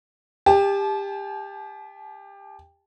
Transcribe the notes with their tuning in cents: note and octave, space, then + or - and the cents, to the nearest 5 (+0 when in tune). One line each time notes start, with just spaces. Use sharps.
G4 +25 A5 -35